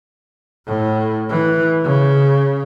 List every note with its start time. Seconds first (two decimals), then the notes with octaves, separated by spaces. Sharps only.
0.66 A2
1.29 E3
1.84 C#3